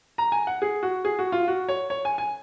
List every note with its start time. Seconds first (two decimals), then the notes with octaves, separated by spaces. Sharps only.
0.18 A#5
0.32 G#5
0.47 F#5
0.62 G#4
0.83 F#4
1.05 G#4
1.19 F#4
1.32 F4
1.48 F#4
1.69 C#5
1.90 C#5
2.05 G#5
2.18 G#5